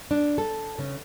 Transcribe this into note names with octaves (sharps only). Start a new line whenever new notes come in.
D4
A4
C#3